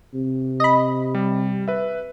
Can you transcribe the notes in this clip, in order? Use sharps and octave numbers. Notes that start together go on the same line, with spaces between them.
C3
D#5 B5
G3
B4 E5